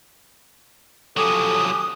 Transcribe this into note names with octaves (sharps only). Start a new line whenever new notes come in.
F3 F#3 C#4 G4 A4 D#6